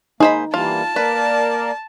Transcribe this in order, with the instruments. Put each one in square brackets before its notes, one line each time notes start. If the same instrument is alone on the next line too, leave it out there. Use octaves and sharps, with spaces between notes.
[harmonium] A#3 [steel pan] D#4 [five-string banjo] G#4 C5 B5
[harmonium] E3 G3 A#3 [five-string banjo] F4 [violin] A5
[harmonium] A#3 A#4 D5 [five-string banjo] B4